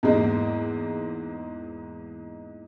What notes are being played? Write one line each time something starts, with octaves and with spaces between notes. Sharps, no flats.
E2 G#2 G#3 A#3